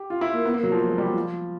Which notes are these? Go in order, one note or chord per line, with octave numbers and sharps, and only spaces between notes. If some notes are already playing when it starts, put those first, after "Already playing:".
Already playing: G4
F4
E4
A#3
B3
A#3
F#3
F3
F#3
G#3
G3
F#3
F3